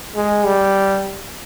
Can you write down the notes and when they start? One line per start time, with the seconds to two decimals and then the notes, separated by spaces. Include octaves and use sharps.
0.15 G#3
0.45 G3